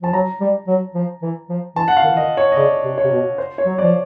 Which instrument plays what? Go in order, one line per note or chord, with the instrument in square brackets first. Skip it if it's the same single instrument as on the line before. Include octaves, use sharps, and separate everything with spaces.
[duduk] F3 [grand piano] A5
[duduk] F#3 [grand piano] A#5
[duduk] G3
F#3
F3
E3
F3
[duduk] E3 [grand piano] A5
[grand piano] F#5
F5
[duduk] D#3
E3
[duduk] D#3 [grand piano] D#5
[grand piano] C#5
D#5
[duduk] C#3 [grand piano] D5
[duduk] C3
[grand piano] C#5
[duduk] C3
B2
[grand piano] C5
C#5
[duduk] F#3
[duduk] F3 [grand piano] D5